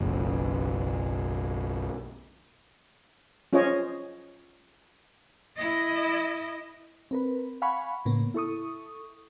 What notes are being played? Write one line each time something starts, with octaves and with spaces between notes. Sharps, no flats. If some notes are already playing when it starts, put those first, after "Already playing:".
F#1 B1
C#4 F4 G#4 C5 C#5 D#5
E4 D#5
C4 A#4 B4
F5 F#5 G#5 B5 C#6
A2 C#3 A#3 B3
E4 A4 C#6 D#6